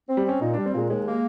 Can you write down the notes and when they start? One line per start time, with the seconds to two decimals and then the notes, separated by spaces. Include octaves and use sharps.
0.08 C4
0.17 G3
0.25 C4 C#4
0.40 A#2 D#4
0.54 D4
0.57 G3
0.66 C4
0.73 A#2 G#3
0.90 D#2 G#3
1.06 A#3